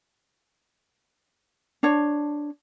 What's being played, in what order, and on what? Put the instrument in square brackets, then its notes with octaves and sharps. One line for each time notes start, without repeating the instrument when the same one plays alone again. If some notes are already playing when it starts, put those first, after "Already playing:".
[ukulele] D4 C#5